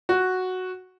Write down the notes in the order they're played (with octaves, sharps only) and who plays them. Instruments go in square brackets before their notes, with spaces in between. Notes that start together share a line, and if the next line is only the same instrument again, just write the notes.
[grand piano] F#4